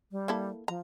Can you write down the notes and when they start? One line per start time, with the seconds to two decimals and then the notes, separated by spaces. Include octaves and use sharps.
0.12 G3
0.28 A#3 E4 A4
0.68 F3 A#5